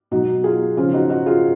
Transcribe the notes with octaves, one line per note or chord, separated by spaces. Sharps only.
B2 F#3 D#4 F#4
F4 G#4
C#3 F3 C#4 F4
D#4 F#4
D#4 F#4
F4 G#4